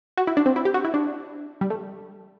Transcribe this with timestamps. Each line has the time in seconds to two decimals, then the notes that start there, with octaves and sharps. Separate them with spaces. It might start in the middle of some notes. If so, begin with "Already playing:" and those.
0.17 F#4
0.27 E4
0.37 D4
0.46 C4
0.56 E4
0.65 G4
0.74 F#4
0.85 E4
0.94 D4
1.61 G3
1.70 A3